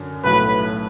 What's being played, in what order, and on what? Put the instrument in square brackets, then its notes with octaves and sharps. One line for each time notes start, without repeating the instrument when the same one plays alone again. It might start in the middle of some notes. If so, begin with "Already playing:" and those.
Already playing: [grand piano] F#2 D3
[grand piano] B1 A2 F#3 [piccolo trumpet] B4